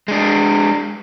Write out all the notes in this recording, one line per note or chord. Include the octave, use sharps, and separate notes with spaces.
G#3 D4